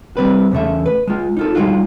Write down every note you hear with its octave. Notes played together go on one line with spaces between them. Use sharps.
G3 C4 B4
E2 C#3 A3 E5
B4
G#3 F4
D#4 F4 A4
G3 G#3 C4 D#4 F4 F#4